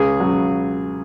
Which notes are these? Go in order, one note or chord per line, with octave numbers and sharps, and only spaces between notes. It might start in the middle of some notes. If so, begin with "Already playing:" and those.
Already playing: C#2 G#4
C#3 F#3